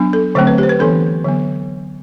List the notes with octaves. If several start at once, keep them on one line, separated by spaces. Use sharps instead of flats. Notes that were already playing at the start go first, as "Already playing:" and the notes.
Already playing: F#3 B3 D4
A4
D3 F#3 A3 C4 C5
B4
G4
C5
B4
E3 B3 D4 A4
D3 F#3 B3